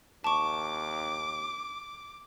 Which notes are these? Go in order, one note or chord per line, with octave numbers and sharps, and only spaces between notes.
D#2 A5 C#6 D6